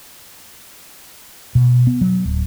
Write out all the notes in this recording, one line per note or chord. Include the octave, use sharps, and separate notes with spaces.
B2
B3
F#3
D1